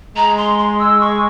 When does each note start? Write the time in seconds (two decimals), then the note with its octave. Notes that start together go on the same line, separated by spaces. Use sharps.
0.16 G#3 A#5
0.37 C6
0.58 C6
0.79 E6
1.00 C#6